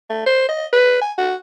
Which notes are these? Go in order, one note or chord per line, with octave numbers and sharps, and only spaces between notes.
A3
C5
D#5
B4
G#5
F#4